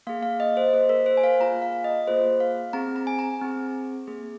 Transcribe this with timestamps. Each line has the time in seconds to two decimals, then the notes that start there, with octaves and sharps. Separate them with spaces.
0.07 A#3 G#4 F5
0.23 F5
0.40 D#5
0.57 C5
0.68 D#5
0.73 A#3 G#4 C5
0.89 A#4
1.06 C5
1.17 G#5
1.24 F5
1.39 A#3 F4 G#4 A#5
1.62 F5
1.84 D#5
2.07 A#3 F4 G#4 C5
2.40 F5
2.73 C4 G#4 A#5
2.96 A#5
3.07 G#5
3.19 A#5
3.41 C4 G#4
4.07 A#3 G#4